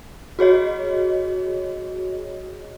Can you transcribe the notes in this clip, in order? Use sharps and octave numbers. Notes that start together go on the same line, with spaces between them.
F#4 G#4 C#5 D#5